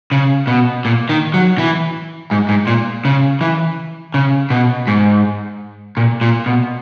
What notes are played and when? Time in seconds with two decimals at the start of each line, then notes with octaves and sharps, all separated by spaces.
0.12 C#3
0.47 B2
0.85 A#2
1.09 D#3
1.34 F#3
1.58 E3
2.31 G#2
2.49 G#2
2.67 A#2
3.05 C#3
3.41 E3
4.14 C#3
4.50 B2
4.87 G#2
5.97 A#2
6.21 A#2
6.46 B2